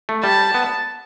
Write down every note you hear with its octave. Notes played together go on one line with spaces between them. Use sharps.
A3
G3 A5
B3